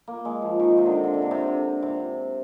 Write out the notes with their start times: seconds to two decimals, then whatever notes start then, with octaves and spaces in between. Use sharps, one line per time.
0.07 A#3
0.25 G#3
0.42 F3
0.60 D#3
0.78 C3
0.86 D3
0.95 C3
1.04 D3
1.14 C3
1.22 D3
1.31 C3
1.48 D3
1.83 C3